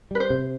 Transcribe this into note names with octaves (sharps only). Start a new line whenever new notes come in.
G3 B4
C5
C3